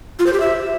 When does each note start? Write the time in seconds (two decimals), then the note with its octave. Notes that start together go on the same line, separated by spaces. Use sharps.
0.19 F4
0.26 C5
0.33 G4
0.40 E5